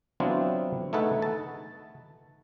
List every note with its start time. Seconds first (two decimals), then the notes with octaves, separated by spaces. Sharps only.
0.20 F#3 B3 C4 D4 E4 F4
0.93 A3 D#4 G#4 A4 B4 F#5
1.22 A5